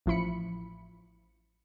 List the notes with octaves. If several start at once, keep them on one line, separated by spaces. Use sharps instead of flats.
A1 F3 E4 B5 C#7